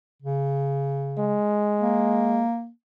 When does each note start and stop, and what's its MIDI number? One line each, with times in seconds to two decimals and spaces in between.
0.22 1.37 49
1.18 2.43 56
1.81 2.69 58